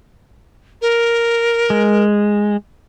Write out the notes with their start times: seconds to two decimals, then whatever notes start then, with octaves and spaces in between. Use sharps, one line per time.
0.82 A#4
1.70 G#3